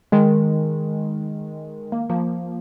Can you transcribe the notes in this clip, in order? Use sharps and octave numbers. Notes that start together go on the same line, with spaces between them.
D#3 G#3
A#3
F3 A#3